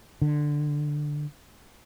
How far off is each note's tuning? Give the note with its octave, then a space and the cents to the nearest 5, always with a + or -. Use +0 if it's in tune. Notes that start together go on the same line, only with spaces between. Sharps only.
D3 +10